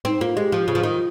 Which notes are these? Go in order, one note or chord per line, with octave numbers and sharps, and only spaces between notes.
C4 D#4
A#3 F4
G#3 G4
F3
C#3 F4
F3
D#3